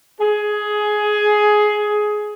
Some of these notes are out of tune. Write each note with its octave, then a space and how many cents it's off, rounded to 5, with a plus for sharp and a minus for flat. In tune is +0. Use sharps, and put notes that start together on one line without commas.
G#4 +15